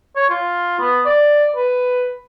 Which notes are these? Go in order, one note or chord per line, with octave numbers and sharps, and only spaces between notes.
C#5
F4
B3
D5
B4